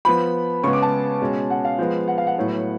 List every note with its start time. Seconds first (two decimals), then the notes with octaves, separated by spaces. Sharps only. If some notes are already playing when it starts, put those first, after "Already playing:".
0.05 F3 B3 B5
0.63 C#3 G#3 B3 C#6
0.73 D6
0.82 A5
1.21 B2 G#3 C#4
1.50 F#5
1.65 F5
1.78 F3 G#3 B3
2.08 F#5
2.18 F5
2.27 F#5
2.36 A2 F#3 B3